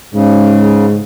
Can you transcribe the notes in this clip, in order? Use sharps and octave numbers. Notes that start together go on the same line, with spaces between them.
G#2 C#3